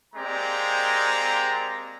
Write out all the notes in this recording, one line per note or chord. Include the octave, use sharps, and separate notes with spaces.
G#3 A#3 C4 G4 D5 A#5